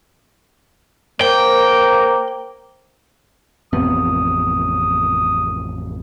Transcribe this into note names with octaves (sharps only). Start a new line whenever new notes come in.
A#3 A#4 C5 G5
A1 F2 C3 B3 D#6